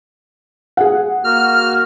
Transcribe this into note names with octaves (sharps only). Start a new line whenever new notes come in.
G#4 F#5
A#3 F#4 F6